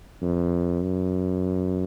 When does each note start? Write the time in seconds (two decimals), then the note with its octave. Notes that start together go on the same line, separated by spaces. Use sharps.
0.22 F2
0.82 F#2